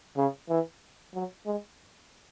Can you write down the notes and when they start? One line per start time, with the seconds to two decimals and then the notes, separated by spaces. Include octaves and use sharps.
0.17 C#3
0.49 E3
1.14 F#3
1.46 G#3